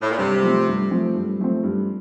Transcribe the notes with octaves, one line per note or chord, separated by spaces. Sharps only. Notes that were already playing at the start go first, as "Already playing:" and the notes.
A2
A#2
G2 C3
F3 A3 C4
G2
F3 A3 C4
G2
F3 A3 C4
G2